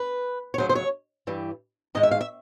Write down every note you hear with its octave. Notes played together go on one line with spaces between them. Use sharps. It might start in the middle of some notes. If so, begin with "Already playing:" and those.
Already playing: B4
C#5
D2 C#3 F#3 C5
C5
C#5
G2 E3 G3
G#2 D#3 G#3 D#5
E5
F5
E5